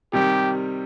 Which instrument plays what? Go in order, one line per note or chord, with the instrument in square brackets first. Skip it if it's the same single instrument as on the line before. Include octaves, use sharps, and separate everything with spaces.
[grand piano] C3 D#3 G3 [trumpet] G4